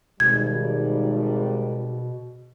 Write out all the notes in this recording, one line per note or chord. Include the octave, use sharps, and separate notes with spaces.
G#1 B2 G3 G#6